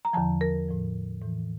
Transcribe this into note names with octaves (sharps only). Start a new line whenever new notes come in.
A#5
E2 D3 F3 A5
A#4
A2 F3
A2 E3